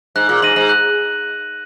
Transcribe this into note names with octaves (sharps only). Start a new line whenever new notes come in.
G#2 F#6
A#2
G#2 A#6 D#7 F#7
G#2
F#6